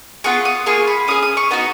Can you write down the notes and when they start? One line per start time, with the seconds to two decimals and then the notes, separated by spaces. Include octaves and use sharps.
0.24 B3 F4 G#4 C#6
0.45 D#6
0.66 A#3 F4 G#4 C#6
0.87 B5
1.08 C#4 G#4 D#6
1.23 D#6
1.37 C#6
1.51 B3 D#4 F#4